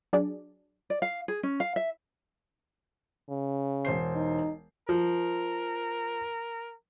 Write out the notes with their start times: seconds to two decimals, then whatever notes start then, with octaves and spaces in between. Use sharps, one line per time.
0.13 F#3 D4 G#4 D5
0.90 D5
1.02 F5
1.28 G#4
1.43 C#4
1.60 F5
1.76 E5
3.29 C#3
3.85 E1 C5 C7
4.16 D#4
4.89 F3 A#4